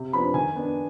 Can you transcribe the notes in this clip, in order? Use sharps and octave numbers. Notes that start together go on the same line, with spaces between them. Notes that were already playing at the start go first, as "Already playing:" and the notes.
Already playing: C3
F3 B3 D4 B5
D#3 G#5
B3 D4